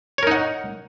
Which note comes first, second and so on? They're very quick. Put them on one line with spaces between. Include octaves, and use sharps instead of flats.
C#5 A#4 D#4 F#5